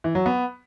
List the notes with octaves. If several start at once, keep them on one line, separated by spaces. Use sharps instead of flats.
E3
F#3
B3